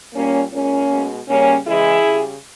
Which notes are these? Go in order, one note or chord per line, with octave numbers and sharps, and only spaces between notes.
A#2 G3 A#3 C#4
A#2 G#3 A#3 C#4
B2 G#3
C#3 G3 A#3 C#4
C#3 E3 G#3 E4 G#4
C#3 G3